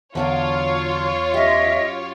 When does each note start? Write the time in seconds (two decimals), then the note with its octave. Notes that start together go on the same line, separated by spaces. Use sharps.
0.15 E2 D3 F#3 D4 F4 C#5
1.34 F#2 G4 D#5 E5